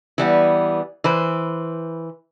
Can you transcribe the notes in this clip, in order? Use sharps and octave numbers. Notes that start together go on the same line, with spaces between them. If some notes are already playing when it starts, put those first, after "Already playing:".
E3 G3 B3
E3 B4 C5